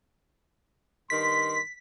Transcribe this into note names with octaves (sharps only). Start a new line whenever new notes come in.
G2 D#3 C6 B6